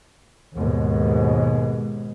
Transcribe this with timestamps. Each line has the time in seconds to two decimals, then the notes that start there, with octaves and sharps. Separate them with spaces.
0.55 D#2 G#2 B2 G#3